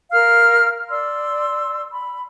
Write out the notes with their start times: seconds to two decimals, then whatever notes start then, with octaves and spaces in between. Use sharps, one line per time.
0.12 A#4 F5 F6
0.90 D5 C6 E6
1.92 B5